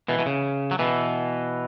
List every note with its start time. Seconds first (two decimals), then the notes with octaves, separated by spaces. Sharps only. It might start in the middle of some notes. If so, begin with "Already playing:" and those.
0.08 B2 E3
0.19 B2
0.26 C#3
0.71 F#3
0.79 B2 E3